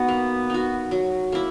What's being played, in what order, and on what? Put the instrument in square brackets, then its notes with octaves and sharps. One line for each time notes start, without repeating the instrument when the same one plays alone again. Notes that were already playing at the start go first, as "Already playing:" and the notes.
Already playing: [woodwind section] B3 [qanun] D#4 F#4
[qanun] A#3
D#4 F#4
F#3
A#3 E4